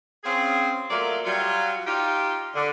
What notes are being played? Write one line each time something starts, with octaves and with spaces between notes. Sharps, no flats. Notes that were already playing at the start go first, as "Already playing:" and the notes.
C4 C#4 F4 G#4
F#3 A3 A#3 F4 D5
F#3 G3 F4
D#4 F4 G4
D3